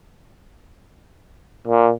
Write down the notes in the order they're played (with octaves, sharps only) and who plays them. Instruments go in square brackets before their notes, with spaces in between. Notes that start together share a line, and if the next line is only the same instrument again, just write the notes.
[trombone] A#2